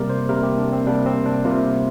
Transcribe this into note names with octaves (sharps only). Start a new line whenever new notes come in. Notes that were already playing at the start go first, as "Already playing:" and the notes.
Already playing: C3 G3 A#3 A#4 D5
C5
C3 G3 A#3 A#4
G4
D4
C4
C3 G3 A#3 D4
C4
D4
C3 G3 A#3 F4